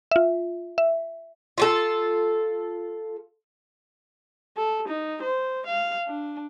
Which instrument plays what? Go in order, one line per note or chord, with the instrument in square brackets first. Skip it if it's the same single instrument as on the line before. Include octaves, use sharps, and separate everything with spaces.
[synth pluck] F4 E5
E5
[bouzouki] F4 F#4 A4
[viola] A4
D#4
C5
F5
D4